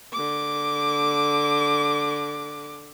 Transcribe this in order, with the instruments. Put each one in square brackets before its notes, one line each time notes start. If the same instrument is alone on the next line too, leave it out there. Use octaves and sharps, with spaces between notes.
[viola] D3 D6